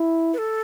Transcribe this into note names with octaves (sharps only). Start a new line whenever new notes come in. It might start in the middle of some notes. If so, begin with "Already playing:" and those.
Already playing: E4
B4
A4